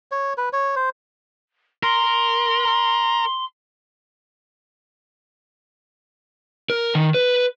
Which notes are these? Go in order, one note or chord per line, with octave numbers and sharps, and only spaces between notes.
C#5
B4
C#5
C5
A#4 C6
A#4
D#3
B4